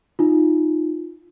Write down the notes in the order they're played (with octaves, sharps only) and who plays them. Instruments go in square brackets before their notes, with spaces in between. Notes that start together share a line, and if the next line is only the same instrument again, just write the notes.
[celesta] D#4 F4